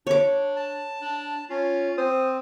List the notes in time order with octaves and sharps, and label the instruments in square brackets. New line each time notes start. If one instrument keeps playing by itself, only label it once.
[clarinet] D4 [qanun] C#5 D6
[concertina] A5
[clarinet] D4
[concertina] C#4 [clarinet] F4
[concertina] C4 [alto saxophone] C5 [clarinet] D#6